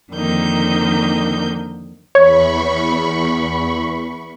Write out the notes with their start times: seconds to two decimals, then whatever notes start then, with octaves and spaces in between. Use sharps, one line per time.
0.13 F2 D3 D#3 A#3 D#4 G6
2.15 E2 C#5 B5 C#6